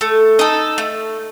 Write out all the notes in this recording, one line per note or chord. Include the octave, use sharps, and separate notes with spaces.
A3
D#4 A4
A3